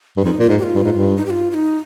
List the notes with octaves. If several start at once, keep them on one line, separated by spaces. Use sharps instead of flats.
G2
F2 D#4
A#2 F4
G#2
G4
F4
G2
G#2
G2
D#4
G4
F4
F4
D#4